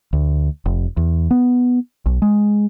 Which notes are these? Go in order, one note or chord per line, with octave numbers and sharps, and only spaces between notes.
D2
F1
E2
B3
B1
G#3